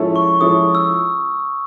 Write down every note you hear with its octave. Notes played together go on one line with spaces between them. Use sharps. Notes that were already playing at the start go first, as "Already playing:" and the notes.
Already playing: F3 G#3 C#4 E4 A4
C#6
F3 G#3 C#4 E4 A4 D#6
E6